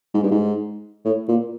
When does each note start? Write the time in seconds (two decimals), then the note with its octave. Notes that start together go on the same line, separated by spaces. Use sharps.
0.14 G#2
0.23 G2
0.31 G#2
1.05 A2
1.28 A#2